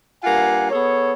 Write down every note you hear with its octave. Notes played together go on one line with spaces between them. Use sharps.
G2 A#3 F4 F#5 G#5
B3 G#4 A4 C#5